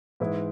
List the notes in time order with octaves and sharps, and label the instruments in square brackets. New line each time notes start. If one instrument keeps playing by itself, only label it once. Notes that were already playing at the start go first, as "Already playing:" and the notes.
[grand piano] G#2 E3 G#3 E4